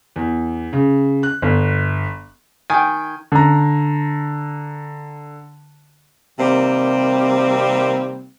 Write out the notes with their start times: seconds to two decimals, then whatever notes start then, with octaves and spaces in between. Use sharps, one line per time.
0.16 E2
0.73 C#3
1.23 F#6
1.42 G1
2.70 D#3 G5 G#5
3.32 D3 A#5
6.39 C3 D#3 G3 A#3 C4